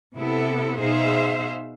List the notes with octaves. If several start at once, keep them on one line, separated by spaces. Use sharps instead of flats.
C3 B3 E4 A4
B2 D#4 G#4 C5 E5 F5